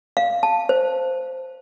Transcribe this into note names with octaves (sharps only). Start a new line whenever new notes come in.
F5
A5
C5